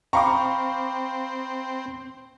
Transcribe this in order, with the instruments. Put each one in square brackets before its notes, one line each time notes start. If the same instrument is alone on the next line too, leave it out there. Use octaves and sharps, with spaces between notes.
[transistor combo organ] C4 [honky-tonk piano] F5 C#6 [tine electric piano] G5 B5 [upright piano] A#5 D6